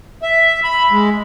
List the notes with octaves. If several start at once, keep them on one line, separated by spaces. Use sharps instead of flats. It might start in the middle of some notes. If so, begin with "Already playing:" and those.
E5
B5
G#3